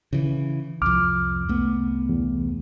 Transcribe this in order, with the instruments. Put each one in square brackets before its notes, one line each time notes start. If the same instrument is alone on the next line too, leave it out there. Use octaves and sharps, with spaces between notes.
[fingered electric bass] C#3 E3
[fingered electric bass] C2 F2 [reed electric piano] D6 F6
[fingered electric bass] C2 A3 B3
[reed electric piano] E2